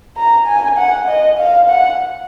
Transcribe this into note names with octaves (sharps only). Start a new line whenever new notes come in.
A#5
G#5
F#5
D#5
F5
F#5